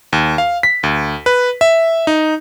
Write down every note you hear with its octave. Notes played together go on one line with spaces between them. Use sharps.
D#2
F5
B6
D2
B4
E5
D#4